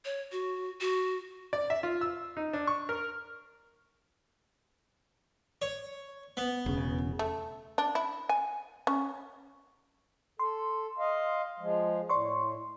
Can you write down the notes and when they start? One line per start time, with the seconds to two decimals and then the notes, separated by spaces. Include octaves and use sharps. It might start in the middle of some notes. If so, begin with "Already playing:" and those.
0.05 C#5
0.32 F#4
0.80 F#4
1.53 D5
1.70 E5
1.83 F4
2.01 E6
2.37 D#4
2.53 D4
2.67 C#6
2.89 A#4
5.62 C#5
6.37 B3
6.66 E1 C#3
7.19 A3
7.78 D4
7.95 E4
8.29 G#5
8.87 C#4
10.39 A4 C6
10.98 D#5 F5
11.59 F3 G#3
12.09 A2 D5 C6 C#6